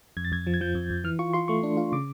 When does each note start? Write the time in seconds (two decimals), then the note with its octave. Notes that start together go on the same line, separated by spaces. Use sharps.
0.17 F2 G#6
0.25 A6
0.32 F2 G#6
0.47 F3
0.54 G#6
0.61 F3 G6
0.75 F2
0.90 F2
1.04 E3 F6
1.19 F4 C#6
1.33 F4 C6
1.48 A3 C#6
1.63 D4
1.77 F4
1.92 C#3 D6